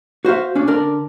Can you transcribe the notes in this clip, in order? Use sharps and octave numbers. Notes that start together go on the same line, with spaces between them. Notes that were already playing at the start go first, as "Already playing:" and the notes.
F#4 C5 E5 F5
C#4 D4
D3 D4 A#4 D5